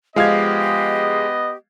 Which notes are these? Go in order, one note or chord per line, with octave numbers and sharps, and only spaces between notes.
F3 G#3 B3 G4 D#5 F5 G#6 F7